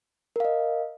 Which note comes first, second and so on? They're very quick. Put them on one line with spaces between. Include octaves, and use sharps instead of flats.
A#4 F5 D#5